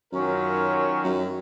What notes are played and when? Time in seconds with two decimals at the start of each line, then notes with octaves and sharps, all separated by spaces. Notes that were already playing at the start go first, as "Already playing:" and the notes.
0.12 F#2 D#3 F#3 C#4 F4 A#4
1.04 F#2